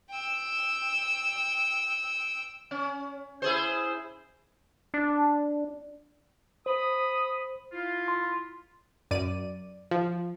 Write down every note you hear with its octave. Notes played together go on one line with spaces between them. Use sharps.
G5 E6
C#4
E4 G#4 C5
D4
C5 B5 D#6
E4 F4
C6
F#2 D5 D#7
F3